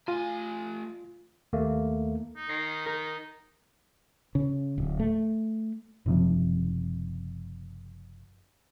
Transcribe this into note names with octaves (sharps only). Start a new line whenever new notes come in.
A3 F4 G#5
D#2 A3 A#3
D#4
D#3 A#6 C7
D#4 A#4
C#3
D1
A3
F#1 C3 F3